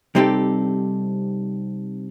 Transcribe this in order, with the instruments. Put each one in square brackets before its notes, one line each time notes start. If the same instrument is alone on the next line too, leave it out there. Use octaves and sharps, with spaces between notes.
[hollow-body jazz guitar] C3 G3 C4 D#4 G4 A4